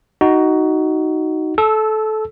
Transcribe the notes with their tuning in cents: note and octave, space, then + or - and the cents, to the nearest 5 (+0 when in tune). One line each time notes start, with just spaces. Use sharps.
D#4 +5 F#4 +15
A4 -20 E6 +0